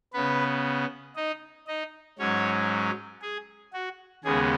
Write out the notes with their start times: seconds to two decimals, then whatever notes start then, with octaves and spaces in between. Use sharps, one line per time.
0.13 C#3 B3 B4
1.16 D#4 D#5
1.67 D#4 D#5
2.19 G#2 F#3 C#4 C#5
3.22 G#4
3.73 F#4
4.24 D#2 C#3 G#3 B3 G#4